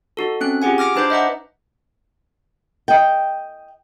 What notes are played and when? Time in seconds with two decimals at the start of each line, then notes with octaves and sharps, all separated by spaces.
0.17 D#4 F#4 A4
0.41 C4 C#4 F#6
0.62 F4 G4 G#4 F#5 G#5
0.78 D6 F6 A#6 D7
0.96 D4 D#4 B4 C5 D6 G6
1.10 D#5 E5 F#5 A#5
2.88 D#5 G5